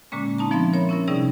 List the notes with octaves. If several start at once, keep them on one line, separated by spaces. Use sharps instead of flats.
A#2 D3 G#3 A#3 C#4
C4 D4 D#4 A5 A#5
F3 B3 E5 C6 A6
A#4 C#5 E5 B5
C#4 E4 A#4
C3 G3 C#4 D#4 G#4 D5